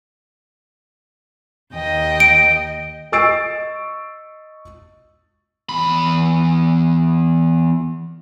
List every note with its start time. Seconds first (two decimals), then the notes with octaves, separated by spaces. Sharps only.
1.73 D#2 D#5 G5
2.20 D7
3.12 D#5 C#6 E6 A6 C7 D7
5.69 E2 B5